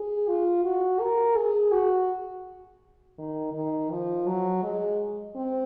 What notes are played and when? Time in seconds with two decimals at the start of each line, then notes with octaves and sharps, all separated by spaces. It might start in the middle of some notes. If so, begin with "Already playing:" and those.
Already playing: G#4
0.28 F4
0.64 F#4
1.00 A#4
1.36 G#4
1.73 F#4
3.19 D#3
3.54 D#3
3.90 F3
4.27 F#3
4.64 G#3
5.35 C4